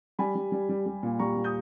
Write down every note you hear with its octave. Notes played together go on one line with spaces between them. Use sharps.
G3 G#5 B5
G3
G3
G3
G3
A#2
G3 A#5 C#6
A#2
D#6 G6